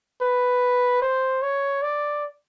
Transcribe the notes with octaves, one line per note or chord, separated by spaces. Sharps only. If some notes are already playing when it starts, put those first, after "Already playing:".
B4
C5
C#5
D5